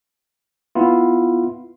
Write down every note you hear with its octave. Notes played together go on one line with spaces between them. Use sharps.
B3 E4 F4